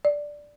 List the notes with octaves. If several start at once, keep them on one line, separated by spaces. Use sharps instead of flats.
D5